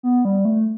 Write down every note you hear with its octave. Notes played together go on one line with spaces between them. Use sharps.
B3
G3
A3